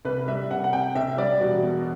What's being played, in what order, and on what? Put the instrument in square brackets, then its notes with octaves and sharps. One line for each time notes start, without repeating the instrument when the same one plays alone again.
[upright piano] C2 B4
G3 E5
C2 F#5
F#5
C3 G5
C2 E5
G3 D5
E1 F#4
B2